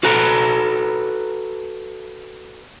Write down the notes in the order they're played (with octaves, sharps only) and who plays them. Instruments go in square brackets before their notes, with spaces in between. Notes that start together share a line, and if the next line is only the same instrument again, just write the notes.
[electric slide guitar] F#4 A4 B4 A#5